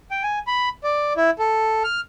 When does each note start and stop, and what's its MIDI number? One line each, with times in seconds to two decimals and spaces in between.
0.11 0.23 79
0.23 0.39 80
0.47 0.69 83
0.84 1.13 74
1.17 1.30 64
1.39 1.83 69
1.84 2.00 89